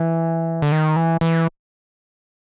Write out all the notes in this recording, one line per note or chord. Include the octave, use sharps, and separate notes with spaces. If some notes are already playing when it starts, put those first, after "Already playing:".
Already playing: E3
D3
D#3
E3
E3